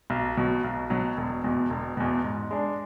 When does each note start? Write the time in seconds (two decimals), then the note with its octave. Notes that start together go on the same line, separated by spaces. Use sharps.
0.10 B1
0.37 B2 F#3
0.64 B1
0.90 B2 F#3
1.17 E1
1.44 E2 B2
1.70 E1
1.97 E2 B2
2.24 G#2
2.51 G#3 D4